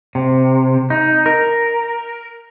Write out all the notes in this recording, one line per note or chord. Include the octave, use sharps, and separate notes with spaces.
C3
D#4
A#4